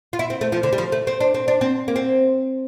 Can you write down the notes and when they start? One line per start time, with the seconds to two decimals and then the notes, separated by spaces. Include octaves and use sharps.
0.13 F4
0.19 E4
0.30 C4
0.41 A3
0.52 F3
0.63 D3
0.73 G3
0.78 F3
0.92 A3
1.07 C4
1.21 D4
1.34 C4
1.48 D4
1.61 C4
1.88 A#3
1.96 C4